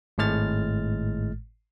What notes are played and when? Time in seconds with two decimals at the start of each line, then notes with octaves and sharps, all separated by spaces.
0.18 G#1 A2 G#3 F6 A6